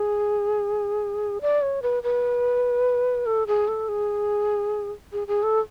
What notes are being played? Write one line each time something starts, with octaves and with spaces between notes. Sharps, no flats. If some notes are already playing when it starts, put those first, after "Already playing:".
Already playing: G#4
D5
C#5
B4
B4
A4
G#4
A4
G#4
G#4
G#4
A4